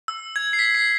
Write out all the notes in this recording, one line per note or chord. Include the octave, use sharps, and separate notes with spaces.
E6
G#6
C7
B6
C7